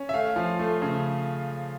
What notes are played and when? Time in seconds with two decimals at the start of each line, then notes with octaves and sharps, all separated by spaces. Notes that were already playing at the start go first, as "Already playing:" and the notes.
Already playing: C#4
0.09 E5
0.14 A3 F5
0.36 F3
0.59 A3
0.82 C#3